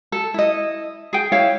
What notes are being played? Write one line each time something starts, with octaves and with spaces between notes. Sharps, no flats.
A4
E4 D#5
G#4 G5
E4 C#5 F5 G5